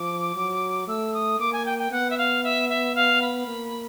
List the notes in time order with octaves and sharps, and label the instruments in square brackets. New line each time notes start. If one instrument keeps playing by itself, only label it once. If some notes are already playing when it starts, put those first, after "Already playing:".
Already playing: [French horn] F3 [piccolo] D6
[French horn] F#3
[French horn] A3 [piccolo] E6
[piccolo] D#6
[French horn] A#3 [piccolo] D6
[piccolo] G#5
G5
G5
[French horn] B3 [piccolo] F#5
[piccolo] E5
F5
E5
E5
F5
B5
[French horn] A#3